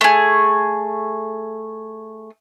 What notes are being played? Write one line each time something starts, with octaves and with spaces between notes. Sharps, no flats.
A3 G#4